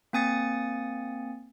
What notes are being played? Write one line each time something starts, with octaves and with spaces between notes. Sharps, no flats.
A#3 C4 G#5 D#6 A6 C#7